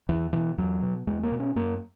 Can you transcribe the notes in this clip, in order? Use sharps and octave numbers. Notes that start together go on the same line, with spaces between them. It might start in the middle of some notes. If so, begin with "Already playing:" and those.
E2 E3
B2 E3
E2 F#3
B2
E2 G#3
A#3
B2
C#4
F#2 A#3